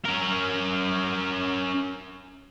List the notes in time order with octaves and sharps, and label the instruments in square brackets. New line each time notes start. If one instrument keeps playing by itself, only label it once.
[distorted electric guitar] C#4 A#4